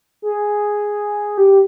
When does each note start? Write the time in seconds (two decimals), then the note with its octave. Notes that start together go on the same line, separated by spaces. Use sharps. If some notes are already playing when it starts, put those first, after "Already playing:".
0.22 G#4
1.38 G4